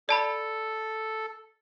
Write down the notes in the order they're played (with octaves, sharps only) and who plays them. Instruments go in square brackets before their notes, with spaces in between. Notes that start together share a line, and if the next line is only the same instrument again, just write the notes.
[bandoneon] A4 [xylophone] D5 A5 B5